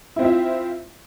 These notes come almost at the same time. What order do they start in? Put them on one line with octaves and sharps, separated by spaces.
E4 C4 F4 E5